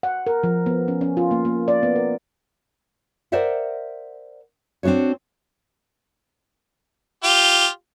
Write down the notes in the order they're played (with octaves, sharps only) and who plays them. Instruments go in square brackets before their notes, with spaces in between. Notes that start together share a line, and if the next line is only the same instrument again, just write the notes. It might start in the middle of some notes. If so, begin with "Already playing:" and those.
[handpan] F#5
A#4
F3
B3
C#4
C#4
F4
A#3
A#3
D5
B3
A#4
[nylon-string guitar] A#4 C5 D5 E5 F#5 G5
C4 D4 D#4 F#4 C#5
[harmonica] F4 G4